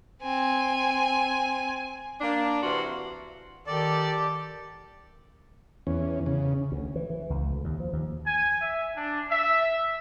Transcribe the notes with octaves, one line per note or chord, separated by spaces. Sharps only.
C4 G#5
A#3 D4
C3 E3 F#4 F5 C6
D#3 G4 A4 D5
E2 C#4
C#3
D2
E3
E3
C#2
D2
D#2
F3
D#2
G#5
E5
D4
E5